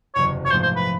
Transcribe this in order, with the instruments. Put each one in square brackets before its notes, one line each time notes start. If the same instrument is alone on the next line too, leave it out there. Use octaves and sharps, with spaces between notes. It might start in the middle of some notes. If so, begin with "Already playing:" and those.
[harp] F#1 E2 C3 [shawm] C#5
[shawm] C#5
[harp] A#1 G#2 F3 A3 [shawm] C5
[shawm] C5
B4